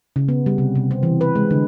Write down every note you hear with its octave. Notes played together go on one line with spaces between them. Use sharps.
C#3
B3
G3
C3
C3
C4
E3
B4
G#3
D3